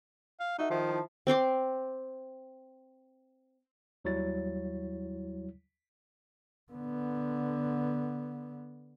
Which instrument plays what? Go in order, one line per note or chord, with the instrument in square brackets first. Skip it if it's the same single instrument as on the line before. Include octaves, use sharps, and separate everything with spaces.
[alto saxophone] F5
[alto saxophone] D#4 [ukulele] F#4 A4 E5
[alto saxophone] D#3 [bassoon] F3
[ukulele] E4 A5
[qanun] C4 G5 C6 D6
[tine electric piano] D#2 F#3 G3 E4 C#5 A6
[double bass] D3 B3